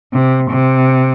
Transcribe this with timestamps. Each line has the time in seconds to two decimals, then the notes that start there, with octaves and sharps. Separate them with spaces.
0.13 C3
0.50 C3